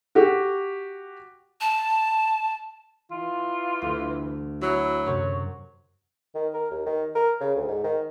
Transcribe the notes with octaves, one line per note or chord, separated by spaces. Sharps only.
F#4 G4
A5
E3 F4
D2
F#3 E4
F#2 C3 C#5
D#3
A#4
D#2
D#3
A#4
C#3
D2
G#2
D#3